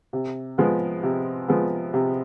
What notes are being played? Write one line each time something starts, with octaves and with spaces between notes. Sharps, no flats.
C3
F3 G#3 B3
C3
F3 G#3 B3
C3